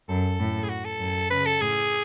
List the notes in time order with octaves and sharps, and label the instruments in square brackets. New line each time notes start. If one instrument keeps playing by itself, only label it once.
[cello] F#2 [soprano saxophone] A4
[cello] A2
[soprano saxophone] G#4
F#4
A4
[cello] F#2
[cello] C#3 [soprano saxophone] B4
[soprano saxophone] A4
[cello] A2 [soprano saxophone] G#4